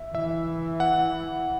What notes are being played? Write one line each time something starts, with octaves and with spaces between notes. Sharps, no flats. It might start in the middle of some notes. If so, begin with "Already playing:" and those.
Already playing: E5
E3 E5
F#5